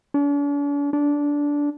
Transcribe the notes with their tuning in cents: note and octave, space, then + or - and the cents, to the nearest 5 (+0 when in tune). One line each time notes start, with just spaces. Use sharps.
D4 -45
D4 -15